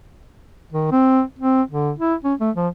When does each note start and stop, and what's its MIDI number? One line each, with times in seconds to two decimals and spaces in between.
0.73 0.87 51
0.92 1.22 60
1.39 1.62 60
1.71 1.92 50
1.99 2.14 64
2.24 2.34 61
2.40 2.50 57
2.56 2.68 53